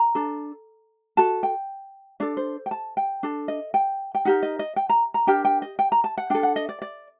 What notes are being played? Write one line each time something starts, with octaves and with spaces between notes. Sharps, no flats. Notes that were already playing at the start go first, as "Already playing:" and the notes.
Already playing: A#5
D4 A4
F#4 A4 A5
G5
D4 A4 D5
C5
G5
A5
G5
D4 A4
D#5
G5
G5
D#4 G4 A#4 F#5
D#5
D#5
G5
A#5
A#5
D4 G4 A#4 G5
G5
D#5
G5
A#5
A5
F#5
D4 A4 G5
F#5
D#5
D5
D5